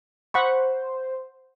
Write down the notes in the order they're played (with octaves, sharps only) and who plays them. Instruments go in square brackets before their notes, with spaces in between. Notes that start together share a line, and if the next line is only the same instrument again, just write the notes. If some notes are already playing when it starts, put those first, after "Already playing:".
[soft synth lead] C5 [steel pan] F#5 B5 C#6